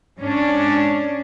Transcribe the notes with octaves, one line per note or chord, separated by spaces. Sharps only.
G#2 C#4 D4